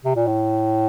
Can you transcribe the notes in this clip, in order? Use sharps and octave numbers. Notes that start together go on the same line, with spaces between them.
C3
A#2
A2